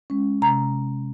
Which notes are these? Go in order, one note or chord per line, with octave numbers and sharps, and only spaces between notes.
G#3 C#4
C3 A#5